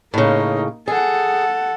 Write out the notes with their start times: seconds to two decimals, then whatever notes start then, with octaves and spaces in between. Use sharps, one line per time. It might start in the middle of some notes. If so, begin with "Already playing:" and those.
0.14 A2 C#3 A#3 D#4
0.88 G#4 A4 F#5